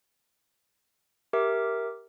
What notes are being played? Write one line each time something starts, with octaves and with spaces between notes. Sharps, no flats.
G4 A#4 E5 D6